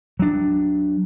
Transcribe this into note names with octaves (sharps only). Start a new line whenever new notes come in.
F#3 D4